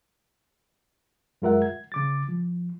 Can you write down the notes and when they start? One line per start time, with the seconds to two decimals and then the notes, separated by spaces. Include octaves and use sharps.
1.42 F#2 G#3 F4 A#4 E5 F#5
1.62 G#6
1.92 C#3 D6 A6
2.29 F3